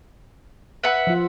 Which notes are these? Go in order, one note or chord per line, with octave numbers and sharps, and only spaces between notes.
B4 E5 F#5
F3 F4